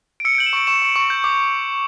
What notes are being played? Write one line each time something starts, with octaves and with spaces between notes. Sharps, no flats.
D7
E6 C#7
D7
G6 F#7
E7
C#6 D7
C#6 E7
C#6
C#6
G6
D6